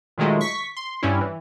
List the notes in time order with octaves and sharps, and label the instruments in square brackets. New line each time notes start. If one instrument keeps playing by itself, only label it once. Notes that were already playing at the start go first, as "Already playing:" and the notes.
[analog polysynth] A#2 D#3 F#3 G#3 A3
C#6 B6
C6
G2 G3 C#4 E4
E3